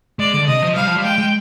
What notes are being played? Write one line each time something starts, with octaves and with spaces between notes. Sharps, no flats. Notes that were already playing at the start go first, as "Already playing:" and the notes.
G#3 D5
D3
C3 D#5
F3
G3 F5
F3
G3
G#3 G5
G#3